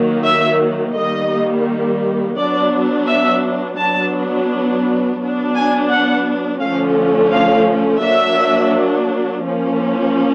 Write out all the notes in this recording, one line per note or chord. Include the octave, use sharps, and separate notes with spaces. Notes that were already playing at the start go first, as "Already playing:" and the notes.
Already playing: D#3 F#3 A#3
E5
D#3 G3 A#3 D#5
F#3 B3 D4 D5
E5
F#3 B3 D4 A5
F#3 B3 D4
G#5
F#5
D3 F3 A3 C#4 F5
F5
F#3 A#3 D4 E5
F3 A#3 C#4